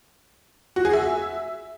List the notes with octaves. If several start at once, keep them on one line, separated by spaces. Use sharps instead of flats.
F#4
G#4
E5